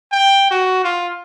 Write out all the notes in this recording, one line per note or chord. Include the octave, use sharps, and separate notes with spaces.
G5
F#4
F4